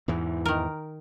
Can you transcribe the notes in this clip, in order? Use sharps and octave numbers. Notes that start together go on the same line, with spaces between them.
E2 G#2 E3
D#3 A#4